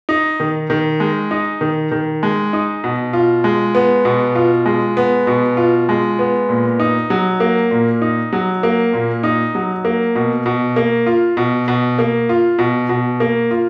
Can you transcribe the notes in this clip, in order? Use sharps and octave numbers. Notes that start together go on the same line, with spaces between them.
D#4
D#3
D#3
G#3
D#4
D#3
D#3
G#3
D#4
B2
F4
G#3
B3
B2
F4
G#3
B3
B2
F4
G#3
B3
A#2
D#4
F#3
A#3
A#2
D#4
F#3
A#3
A#2
D#4
F#3
A#3
B2
B2
A#3
F4
B2
B2
A#3
F4
B2
B2
A#3
F4